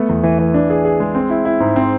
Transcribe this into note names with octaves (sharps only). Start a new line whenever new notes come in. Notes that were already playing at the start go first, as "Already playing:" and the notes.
Already playing: A3 B3
E2
E3
E3
D4
G#4
G#4
G#3
C4
E4
E4
G#2
C4